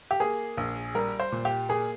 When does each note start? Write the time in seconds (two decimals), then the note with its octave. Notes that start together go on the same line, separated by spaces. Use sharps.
0.11 G4
0.20 A#3 G#4
0.57 A#1
0.95 G3 A#4
1.20 C5
1.32 A#2
1.45 G4
1.69 A#3 G#4